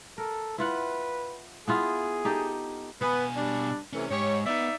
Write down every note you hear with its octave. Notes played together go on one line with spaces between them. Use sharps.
A4 A#4
E4 F4 B4 F#5
B3 E4 F4 G#4
D#4 G4 A4
B2 B3 G#5
G3 D4
C3 E3 A3 C#4
G#2 G4 C#5
B3 D#4 D5 E5